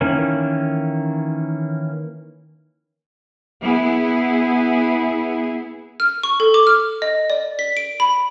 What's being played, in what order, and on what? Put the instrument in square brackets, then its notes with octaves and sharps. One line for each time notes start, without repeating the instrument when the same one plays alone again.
[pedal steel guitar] D#3 E3 A#3 C#4
[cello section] B3 E4 G#4
[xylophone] F6
C#6
A4
D6
F6
D#5
D5
B6
D7
B5